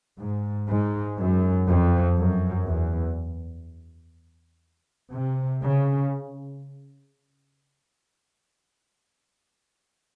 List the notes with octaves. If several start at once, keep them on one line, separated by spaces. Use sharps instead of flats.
G#2
G#2
F#2
F2
F#2
E2
C3
C#3